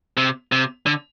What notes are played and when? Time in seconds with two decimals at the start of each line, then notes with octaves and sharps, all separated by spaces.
0.17 C3
0.52 C3
0.86 D3